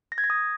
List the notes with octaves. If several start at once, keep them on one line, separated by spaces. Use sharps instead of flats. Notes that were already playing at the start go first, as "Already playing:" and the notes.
A#6
G#6
A#6
D#6